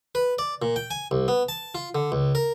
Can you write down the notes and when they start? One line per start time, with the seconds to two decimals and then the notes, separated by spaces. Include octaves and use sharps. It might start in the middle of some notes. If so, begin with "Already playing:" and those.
0.15 B4
0.39 D5
0.62 A#2
0.76 G5
0.91 G#5
1.11 C2
1.28 B3
1.49 A5
1.75 F4
1.95 D3
2.12 C#2
2.35 A#4